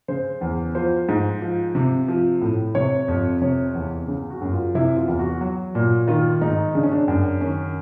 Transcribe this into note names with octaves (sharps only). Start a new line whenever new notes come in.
C#3 C5
E2
F3 C5
G#2
F3
C3
F3
A2
C3 C#5
F2
C3 C#5
E2
C#3
F#4
F#2
F4
C3 E4
F4
E2
F#4
F#3
A#2
D#3 F4
G#2 D#4
C#3 D4
C#4
D4
F#2
D#3 C#4